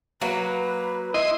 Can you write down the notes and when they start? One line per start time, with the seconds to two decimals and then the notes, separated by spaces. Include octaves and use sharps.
0.21 F#3 A#3 B4
1.14 E4 D#5 C6 D#6